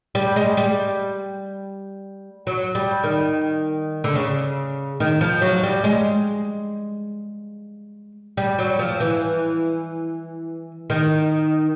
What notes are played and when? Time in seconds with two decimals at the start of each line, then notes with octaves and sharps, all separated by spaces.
0.15 G3
0.36 G#3
0.57 G3
2.47 F#3
2.75 G3
3.04 D#3
4.04 D3
4.15 C#3
5.00 D#3
5.21 F3
5.42 F#3
5.63 G3
5.84 G#3
8.37 G3
8.58 F#3
8.79 F3
9.00 E3
10.90 D#3